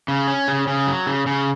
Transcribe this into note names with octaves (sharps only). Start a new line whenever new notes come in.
C#3
C#4
C#3
C#3
F#3
C#3
C#3